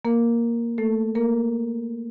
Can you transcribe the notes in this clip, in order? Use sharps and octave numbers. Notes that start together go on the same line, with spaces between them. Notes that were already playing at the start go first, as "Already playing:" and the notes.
A#3 A#4
A3 A4
A#3 A#4